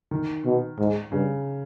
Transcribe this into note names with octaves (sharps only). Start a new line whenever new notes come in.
D#3
B2
G#2
G2 C#3